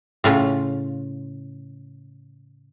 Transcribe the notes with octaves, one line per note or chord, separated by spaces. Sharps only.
A2 C#3 F4